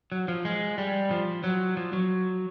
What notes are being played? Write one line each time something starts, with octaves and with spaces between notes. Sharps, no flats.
F#3
F3
G#3
G3
F3
F#3
F3
F#3